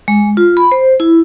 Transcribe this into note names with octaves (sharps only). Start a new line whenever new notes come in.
G#3
F4
B5
C5
E4